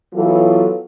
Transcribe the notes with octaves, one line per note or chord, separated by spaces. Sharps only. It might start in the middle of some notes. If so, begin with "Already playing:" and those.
E3 F#3 B3 F4 A4